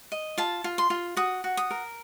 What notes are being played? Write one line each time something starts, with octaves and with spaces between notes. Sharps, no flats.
D#5
F4 A5
F4
C6
F4
F#4 D#6
F#4
D#6
A#4